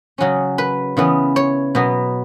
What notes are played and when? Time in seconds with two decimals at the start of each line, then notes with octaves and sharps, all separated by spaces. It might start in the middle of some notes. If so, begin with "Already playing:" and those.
0.18 C#3 F#3 C#4
0.58 B4
0.97 C#3 E3 B3
1.36 C#5
1.75 B2 F#3 B3